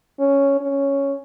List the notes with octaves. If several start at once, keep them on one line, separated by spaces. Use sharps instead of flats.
C#4
C#4